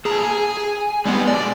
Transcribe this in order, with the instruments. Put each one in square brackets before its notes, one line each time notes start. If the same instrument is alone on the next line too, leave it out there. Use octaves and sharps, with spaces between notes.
[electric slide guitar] A#2 A4 A#5 [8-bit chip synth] G#4
[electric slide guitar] G#5
[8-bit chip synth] G3 G#3 B3 [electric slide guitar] C4 D#4 G#4
[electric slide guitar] B2 G#3 [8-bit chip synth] D5